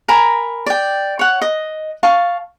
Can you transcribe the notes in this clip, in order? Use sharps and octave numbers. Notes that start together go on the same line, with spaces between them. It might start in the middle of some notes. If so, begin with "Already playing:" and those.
A#4 G#5 A#5 B5
D5 G5
C#5 F#5
D#5
F5 A5 C#6